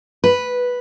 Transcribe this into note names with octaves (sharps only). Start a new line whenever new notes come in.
B4